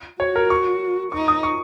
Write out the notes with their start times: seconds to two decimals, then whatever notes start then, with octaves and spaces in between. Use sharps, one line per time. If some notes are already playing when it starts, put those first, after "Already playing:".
0.20 F#4 C#5
0.36 A#4
0.50 C#6
1.12 D#4 C#6
1.28 D#6
1.43 C#6